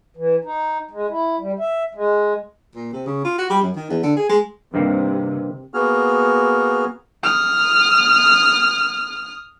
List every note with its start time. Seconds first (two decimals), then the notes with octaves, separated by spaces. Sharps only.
0.17 E3
0.45 D#4
0.91 G#3
1.09 E4
1.39 G3
1.59 E5
1.95 G#3
2.75 A#2
2.93 C3
3.06 C#3
3.25 F4
3.38 F#4
3.50 G3
3.62 F#2
3.75 D#3
3.90 E2
4.03 D3
4.16 G#4
4.29 G#3
4.74 G2 C3 D#3 A#3
5.74 A#3 B3 F#4 G#4 F6
7.24 D#6 F6